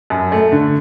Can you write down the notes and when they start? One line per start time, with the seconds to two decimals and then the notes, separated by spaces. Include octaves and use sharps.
0.10 F#2
0.32 A3
0.52 D3